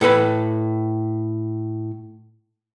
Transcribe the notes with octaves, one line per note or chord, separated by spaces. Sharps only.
A2 A4 B4 B5